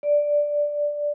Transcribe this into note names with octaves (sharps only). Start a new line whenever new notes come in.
D5